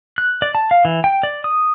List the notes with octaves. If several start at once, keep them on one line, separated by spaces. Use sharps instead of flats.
F#6
D5
A5
F5
E3
G5
D5
D#6